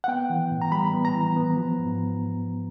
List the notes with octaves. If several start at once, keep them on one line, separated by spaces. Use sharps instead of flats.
F#5
B3 G5
E3
A2
A#5
G3 B5
B3
A#5
E3
B3
F3
G#2